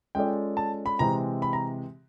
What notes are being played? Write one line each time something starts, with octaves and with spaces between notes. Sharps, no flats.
G#3 C#4 F4 A4 D5 G5
A5
B5
C3 E3 G#3 C4 A#5
B5
A#5